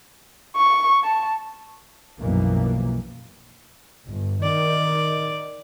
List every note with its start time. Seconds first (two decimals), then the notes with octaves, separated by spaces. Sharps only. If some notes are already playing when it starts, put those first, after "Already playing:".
0.57 C#6
1.04 A5
2.19 B1 F#2 B2 E3 F3 A#3
4.08 G1
4.43 D#3 D5